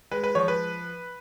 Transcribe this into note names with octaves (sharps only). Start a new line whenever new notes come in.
G#3 B4
B4
F3 C#5
B4